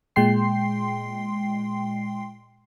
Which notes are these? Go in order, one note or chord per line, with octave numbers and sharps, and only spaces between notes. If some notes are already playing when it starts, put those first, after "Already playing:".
A#2 G#3 G5 C6 C7